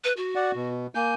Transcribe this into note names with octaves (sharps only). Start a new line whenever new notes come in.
B4
F#4
D5 F#5
B2
A#3 G#5 G6